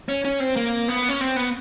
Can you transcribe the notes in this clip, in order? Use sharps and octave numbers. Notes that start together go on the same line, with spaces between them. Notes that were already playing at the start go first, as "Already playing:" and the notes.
C#4
C#4
C4
A#3
B3
C#4
C4
B3